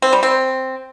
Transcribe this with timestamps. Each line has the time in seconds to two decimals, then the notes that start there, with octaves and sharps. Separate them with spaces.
0.02 C4
0.13 G3
0.23 C4